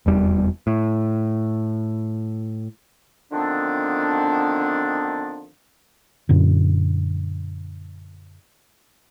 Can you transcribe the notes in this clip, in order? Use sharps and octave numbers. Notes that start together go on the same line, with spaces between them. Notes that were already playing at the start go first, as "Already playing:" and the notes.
F1 E2 G3
A2
D3 D#3 F3 B3 C4 D4
F#2 A#2 D3